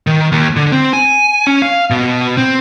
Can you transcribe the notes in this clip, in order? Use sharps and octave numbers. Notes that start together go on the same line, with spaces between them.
D#3
D#2
D3
C4
G#5
C#4
F5
B2
C4